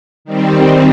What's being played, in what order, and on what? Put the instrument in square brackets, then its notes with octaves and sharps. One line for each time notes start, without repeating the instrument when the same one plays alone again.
[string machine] D#3 G3 C4